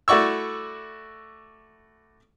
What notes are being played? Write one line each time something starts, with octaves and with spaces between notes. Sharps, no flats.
A3 E4 F#4 D5 C#6 E6